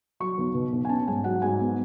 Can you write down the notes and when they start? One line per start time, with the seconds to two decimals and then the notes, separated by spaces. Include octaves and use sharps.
0.20 F#3 C#6
0.38 B1
0.54 B2
0.73 B1
0.85 G#5
0.89 C#4 A5
1.07 G#2 G#5
1.24 F#3 F#5
1.42 G#2 G#5
1.60 B3